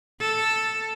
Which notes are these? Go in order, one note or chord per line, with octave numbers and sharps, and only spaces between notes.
A4